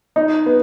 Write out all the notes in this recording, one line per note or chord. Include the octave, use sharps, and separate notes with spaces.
D#4
B3